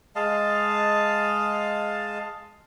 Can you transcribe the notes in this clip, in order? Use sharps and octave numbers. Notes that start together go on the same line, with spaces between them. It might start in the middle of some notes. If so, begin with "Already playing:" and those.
G#3 D#5 F5 A5